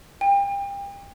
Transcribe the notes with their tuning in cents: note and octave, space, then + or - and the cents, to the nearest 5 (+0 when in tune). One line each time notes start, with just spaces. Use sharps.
G5 +35